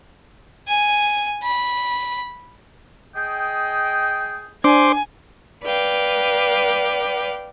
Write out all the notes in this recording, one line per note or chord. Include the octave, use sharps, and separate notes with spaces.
G#5
B5
G#4 D#5 G5
D4 C5 G#5 D6
B4 D5 F5 G5